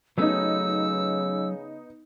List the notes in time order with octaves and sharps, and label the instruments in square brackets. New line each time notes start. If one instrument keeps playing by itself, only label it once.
[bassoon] C#3 [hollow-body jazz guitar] F#3 A3 C#4 [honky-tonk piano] B3 D#4 [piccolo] E6